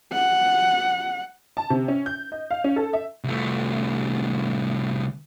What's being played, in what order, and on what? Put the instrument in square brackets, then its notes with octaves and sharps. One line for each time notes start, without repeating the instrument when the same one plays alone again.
[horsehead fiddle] F#5
[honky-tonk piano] A5
C3
C#4
G6
D#5
F5
C#4
A4
E5
[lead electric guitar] C2 A3